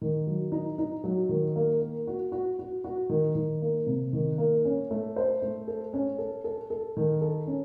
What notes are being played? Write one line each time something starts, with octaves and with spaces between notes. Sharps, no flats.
D#3
F#3
D#4
D#4
F#3
D#3
A#3
A#3
F#4
F#4
F#4
F#4
D#3
D#3
A#3
C3
D#3
A#3
C#4
A3
C5
A3
A4
C#4
A4
A4
A4
D#3
A4
C#4